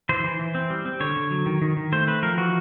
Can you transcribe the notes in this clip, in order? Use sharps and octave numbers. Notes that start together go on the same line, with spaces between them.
E3 C5
E3
E3
C4
G3
C4
D3 C#5
D3
F#3
D#3
D#3
D#3
A3 C5
C4 B4
F3 A#4
E3 F#4